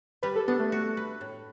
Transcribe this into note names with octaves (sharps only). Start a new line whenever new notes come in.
G3 B4
A4
B3 D4
A3
F#4
B4
A2